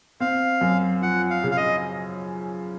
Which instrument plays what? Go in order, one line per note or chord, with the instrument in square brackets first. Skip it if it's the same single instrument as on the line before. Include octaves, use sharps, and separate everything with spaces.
[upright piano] C4 [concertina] F5
[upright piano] F#2
[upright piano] F3 [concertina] F#5
[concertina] F5
[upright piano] C#3
[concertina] F5
D#5